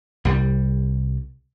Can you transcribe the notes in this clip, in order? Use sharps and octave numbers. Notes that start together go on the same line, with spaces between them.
C2 G3